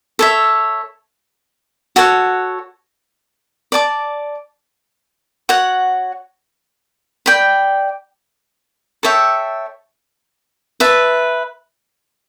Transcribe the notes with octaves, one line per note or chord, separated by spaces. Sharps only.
A4 C#5 E5
F#4 A4 C#5 F#5
D5 A5 D6
F#4 C#5 F#5
D5 G5 B5
A4 C#5 E5 G5
B4 E5 A5